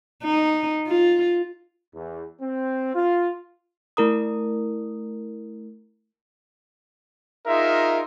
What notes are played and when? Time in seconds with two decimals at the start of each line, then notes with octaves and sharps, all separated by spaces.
0.24 D#4
0.87 F4
1.94 E2
2.41 C4
2.95 F4
3.97 A3 E4 A#4 A#5 D#6
7.47 D#4 F4 G#4 A#4 E5